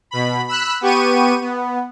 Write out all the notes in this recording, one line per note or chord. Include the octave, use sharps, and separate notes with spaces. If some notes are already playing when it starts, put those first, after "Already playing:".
B2 B5
B5 E6 F#6
B3 G4 C#6 D#7
B3